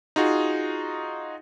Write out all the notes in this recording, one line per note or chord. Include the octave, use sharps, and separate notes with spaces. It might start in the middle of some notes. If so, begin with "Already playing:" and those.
D#4 F4 F#4 G#4